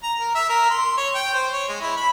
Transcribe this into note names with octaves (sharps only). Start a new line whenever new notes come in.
A#5
A#4
E5
A#4
C6
C#5
G5
C5
C#5
G#3
E4
B5